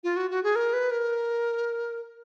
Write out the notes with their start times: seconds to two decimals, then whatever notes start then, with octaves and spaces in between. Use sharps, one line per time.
0.04 F4
0.16 F#4
0.31 F#4
0.44 G#4
0.56 A#4
0.73 B4
0.91 A#4